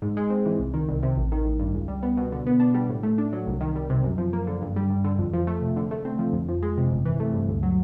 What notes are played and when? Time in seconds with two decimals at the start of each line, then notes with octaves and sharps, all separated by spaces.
0.02 G#2
0.17 G#3
0.30 C4
0.46 E3
0.60 C2
0.74 D#3
0.88 C2
1.03 C3
1.17 A1
1.32 D#3
1.45 A1
1.59 G2
1.74 C#2
1.88 G3
2.03 B3
2.17 B2
2.32 D3
2.47 B3
2.60 D4
2.74 G3
2.89 A2
3.03 A3
3.18 D4
3.33 F#3
3.47 C2
3.61 D#3
3.76 G3
3.90 C3
4.04 F#2
4.18 F3
4.33 A#3
4.47 D3
4.62 G2
4.76 G3
4.90 G2
5.04 D3
5.19 F2
5.33 F3
5.47 A3
5.61 C3
5.76 D3
5.91 A3
6.05 C4
6.19 F3
6.33 F2
6.48 F3
6.63 G#3
6.77 C3
6.92 G1
7.05 E3
7.20 A3
7.34 G2
7.49 D2
7.63 F#3